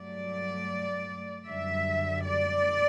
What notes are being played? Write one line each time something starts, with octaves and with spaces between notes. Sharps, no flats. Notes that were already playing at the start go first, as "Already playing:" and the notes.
Already playing: G2 F#3 A3 D5
F#2 D3 G3 E5
D5